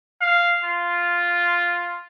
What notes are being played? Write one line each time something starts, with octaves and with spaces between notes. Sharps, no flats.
F5
F4